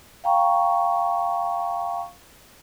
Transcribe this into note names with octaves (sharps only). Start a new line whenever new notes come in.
F5 G5 A#5 C#6